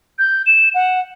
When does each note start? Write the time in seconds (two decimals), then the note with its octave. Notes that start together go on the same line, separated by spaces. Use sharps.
0.18 G6
0.46 E7
0.74 F#5